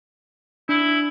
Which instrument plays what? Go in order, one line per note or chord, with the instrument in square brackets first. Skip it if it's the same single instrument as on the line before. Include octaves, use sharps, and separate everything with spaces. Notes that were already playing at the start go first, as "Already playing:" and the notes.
[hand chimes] D4 [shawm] E4